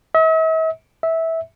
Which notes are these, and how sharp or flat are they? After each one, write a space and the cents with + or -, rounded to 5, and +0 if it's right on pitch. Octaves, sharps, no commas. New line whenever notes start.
E5 -45
E5 -15